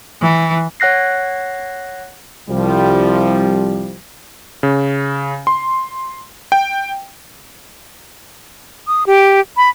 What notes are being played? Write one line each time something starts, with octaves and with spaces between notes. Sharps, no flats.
E3
C#5 F#5 F#6 A#6 C7
C2 F3 G3
C#3
C6
G5
D#6
G4
B5